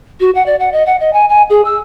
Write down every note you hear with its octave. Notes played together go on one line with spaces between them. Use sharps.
F#4
F#5
D5
F#5
D#5
F#5
D#5
G#5
G#5
G#4
E6